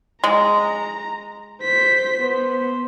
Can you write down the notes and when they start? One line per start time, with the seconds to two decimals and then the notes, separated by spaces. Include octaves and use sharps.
0.24 G#3 A#5
1.62 C5 B6
2.20 B3 C5